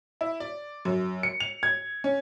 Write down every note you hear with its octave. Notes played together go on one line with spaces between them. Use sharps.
E4
D5
F#2
C#7
F7
G#6
C#4